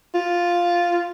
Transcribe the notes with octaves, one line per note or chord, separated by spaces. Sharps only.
F4